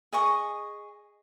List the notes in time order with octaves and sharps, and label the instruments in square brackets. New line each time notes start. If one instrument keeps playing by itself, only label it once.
[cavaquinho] G#4 D#5 C#6 D#6